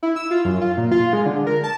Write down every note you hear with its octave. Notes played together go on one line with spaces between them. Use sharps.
E4
E6
F4
F#2
F4
A#2
F4
G#3
D3
A#4
A5